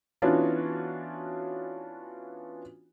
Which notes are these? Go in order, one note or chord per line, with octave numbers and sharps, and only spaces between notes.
E3 B3 C#4 D4 F4 F#4